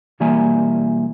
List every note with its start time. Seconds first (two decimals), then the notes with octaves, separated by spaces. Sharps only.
0.20 B1 E3 G3 A#3 E5 G#5